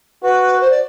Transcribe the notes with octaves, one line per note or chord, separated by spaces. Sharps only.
F#4 B4
C5
D5